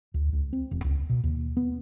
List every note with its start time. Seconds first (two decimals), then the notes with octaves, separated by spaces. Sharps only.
0.14 D2
0.33 C#2
0.53 C4
0.71 E1
0.84 C#2
1.10 B2
1.24 D#2
1.57 B3